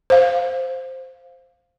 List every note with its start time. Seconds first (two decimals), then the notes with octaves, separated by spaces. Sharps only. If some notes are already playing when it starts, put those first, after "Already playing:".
0.10 C5 F5